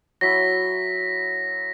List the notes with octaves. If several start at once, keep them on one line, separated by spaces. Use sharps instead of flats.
F#3 E4 A#6 B6